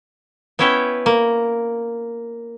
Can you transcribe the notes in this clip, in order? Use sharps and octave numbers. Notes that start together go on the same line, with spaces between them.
B3 C#4 E4 B4 C#5 G5
A#3